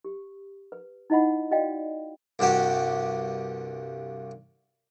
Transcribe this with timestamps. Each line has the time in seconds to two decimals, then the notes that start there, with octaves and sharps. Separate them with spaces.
0.05 G4
0.72 B4
1.10 D#4 E4 D#5 F#5 B5
1.51 F#4 D5 D#5 F5 G5
2.39 C2 G2 F#4 G4 D6